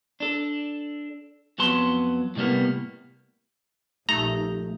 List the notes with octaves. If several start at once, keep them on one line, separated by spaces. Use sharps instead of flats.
D4 A4
F2 F#3 B3 A5 C6
A2 C3 G3 A#3 B3
A#1 A3 D#4 G4 A#5